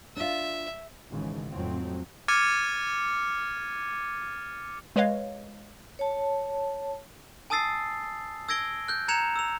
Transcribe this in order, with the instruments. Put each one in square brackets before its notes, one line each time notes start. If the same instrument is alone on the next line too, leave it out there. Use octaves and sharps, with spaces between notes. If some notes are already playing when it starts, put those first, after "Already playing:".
[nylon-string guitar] D4 F4 [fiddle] E5
[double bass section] G#1 G#2 C#3 E3
F2 A2 F#3 C4
[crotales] D6 F6 G#6 A6 C#7 D#7
[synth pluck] G#3 B4 C#5 D#5 F5
[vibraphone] C#5 A5
[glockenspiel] G#5 A5 D#6 E6 A6 C7
E6 G#6 A#6 D7 G7
F#6 G6
A#5 F#6 G#6 C#7 E7 F7
E6 F7